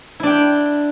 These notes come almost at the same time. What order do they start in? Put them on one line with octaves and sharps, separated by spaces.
E4 D4 G5